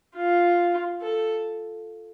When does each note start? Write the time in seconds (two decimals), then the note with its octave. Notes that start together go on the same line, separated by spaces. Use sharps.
0.16 F4
1.02 A4